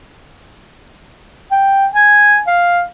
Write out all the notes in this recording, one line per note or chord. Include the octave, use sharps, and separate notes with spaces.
G5
G#5
F5